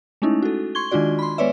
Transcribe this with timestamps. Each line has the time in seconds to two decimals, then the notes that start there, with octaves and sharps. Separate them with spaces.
0.22 G#3 A3 C#4 D#4 E4
0.42 F#4 A4
0.75 C6 C#6 G#6 G7
0.91 D#3 G#3 D4 F4 F#4 D5
1.19 B5 C6
1.38 G#3 B3 B4 C#5 D5 E5